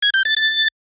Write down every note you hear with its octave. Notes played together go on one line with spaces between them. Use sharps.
G#6
G6
A6
A6